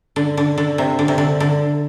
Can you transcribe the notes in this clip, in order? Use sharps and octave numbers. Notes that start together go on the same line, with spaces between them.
D3
D3
D3
C3
D3
C3
D3
D3